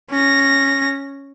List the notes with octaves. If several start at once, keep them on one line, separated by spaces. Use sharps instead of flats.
C#4 A#6